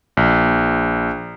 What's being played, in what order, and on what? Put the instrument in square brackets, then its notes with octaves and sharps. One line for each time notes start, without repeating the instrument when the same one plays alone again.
[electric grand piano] A#1